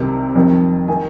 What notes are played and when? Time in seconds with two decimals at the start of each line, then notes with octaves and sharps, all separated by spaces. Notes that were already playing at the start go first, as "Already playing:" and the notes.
Already playing: C2 C3 D#3
0.35 F2 D#3
0.88 D#3 G#5